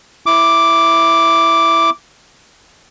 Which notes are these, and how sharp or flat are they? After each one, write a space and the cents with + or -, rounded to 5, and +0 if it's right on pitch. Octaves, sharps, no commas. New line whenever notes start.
E4 +0 D6 +0